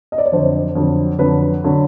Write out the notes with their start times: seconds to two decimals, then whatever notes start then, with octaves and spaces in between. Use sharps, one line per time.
0.12 D#5
0.18 D5
0.26 C#5
0.32 F2 D3 F#3 C5
0.75 F2 D3 F#3
1.19 F2 D3 F#3 B4
1.64 D3 F#3